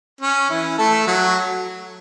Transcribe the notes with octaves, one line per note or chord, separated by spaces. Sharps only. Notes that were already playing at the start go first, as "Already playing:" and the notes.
C#4
E3 E4
A3 A4
F#3 F#4